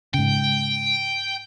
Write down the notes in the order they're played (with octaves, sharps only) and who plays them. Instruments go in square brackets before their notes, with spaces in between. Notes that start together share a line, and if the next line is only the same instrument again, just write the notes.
[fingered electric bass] G#2 C#3 [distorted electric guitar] G5